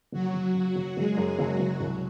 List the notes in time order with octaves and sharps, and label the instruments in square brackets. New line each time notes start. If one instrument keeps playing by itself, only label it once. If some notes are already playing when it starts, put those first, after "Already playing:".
[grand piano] F#1 [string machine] F#3 F#4
[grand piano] F#1
[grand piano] C#3 [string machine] F#3 F#4
[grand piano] F#1
[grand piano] F#1 [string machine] G#3 G#4
[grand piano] F#2
[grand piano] F#1 [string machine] F#3 F#4
[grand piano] F#1
C2